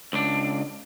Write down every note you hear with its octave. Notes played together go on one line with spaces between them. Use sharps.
C#2 D4